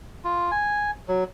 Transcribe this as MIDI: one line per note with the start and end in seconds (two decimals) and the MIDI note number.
0.24 0.51 65
0.51 0.91 80
1.08 1.24 54